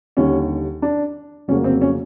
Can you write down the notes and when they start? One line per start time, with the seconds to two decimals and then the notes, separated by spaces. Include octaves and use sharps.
0.17 D#2 D3 G3 C#4
0.82 D4
1.48 F1 F2 C#3 F#3 A#3 C#4
1.64 C4
1.81 C#4